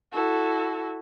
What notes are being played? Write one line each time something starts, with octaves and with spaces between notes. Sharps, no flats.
E4 F#4 A4